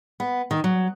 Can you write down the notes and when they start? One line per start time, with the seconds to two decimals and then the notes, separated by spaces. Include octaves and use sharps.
0.20 B3
0.51 D#3
0.64 F#3